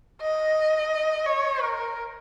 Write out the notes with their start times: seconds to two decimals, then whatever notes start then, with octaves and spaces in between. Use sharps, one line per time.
0.21 D#5
1.26 C#5
1.62 A#4